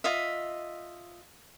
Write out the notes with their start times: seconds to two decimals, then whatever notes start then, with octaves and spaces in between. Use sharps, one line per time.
0.04 F4 D#5 E5